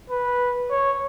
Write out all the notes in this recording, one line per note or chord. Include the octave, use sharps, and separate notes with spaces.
B4
C#5